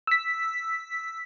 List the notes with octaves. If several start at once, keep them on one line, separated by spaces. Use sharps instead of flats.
E6 B6